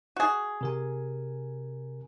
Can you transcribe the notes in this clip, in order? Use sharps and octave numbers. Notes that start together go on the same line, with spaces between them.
F#4 G#4
C3 A#4 G#5